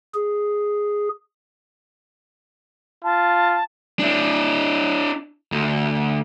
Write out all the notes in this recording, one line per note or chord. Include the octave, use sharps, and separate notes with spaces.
G#4
F4 A5
D4 E4
D2